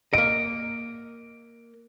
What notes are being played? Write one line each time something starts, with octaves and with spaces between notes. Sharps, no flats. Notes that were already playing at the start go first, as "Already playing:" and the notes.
A#3 D#5 D7